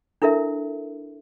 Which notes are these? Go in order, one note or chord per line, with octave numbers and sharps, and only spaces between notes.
D4 E4 A4 A#4 E5